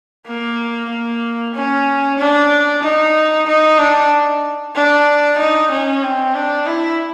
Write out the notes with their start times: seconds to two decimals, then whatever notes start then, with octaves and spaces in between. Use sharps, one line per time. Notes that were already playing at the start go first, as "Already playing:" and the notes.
0.27 A#3
0.90 A#3
1.55 C#4
2.18 D4
2.83 D#4
3.47 D#4
3.79 D4
4.75 D4
5.38 D#4
5.71 C#4
6.03 C4
6.35 D4
6.67 E4